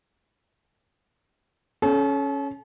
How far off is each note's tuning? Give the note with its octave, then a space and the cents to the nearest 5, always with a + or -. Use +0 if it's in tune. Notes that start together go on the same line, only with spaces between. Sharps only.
C#4 +0 A4 -40